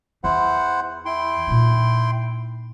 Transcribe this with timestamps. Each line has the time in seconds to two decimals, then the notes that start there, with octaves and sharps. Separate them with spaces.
0.24 E2 E4 C5 F#5
1.06 E4 G5 C6
1.47 A#2 D#4